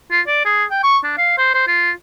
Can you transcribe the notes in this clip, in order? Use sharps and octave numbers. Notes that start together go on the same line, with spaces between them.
F4
D5
G#4
G5
C#6
D4
F5
C5
C5
F4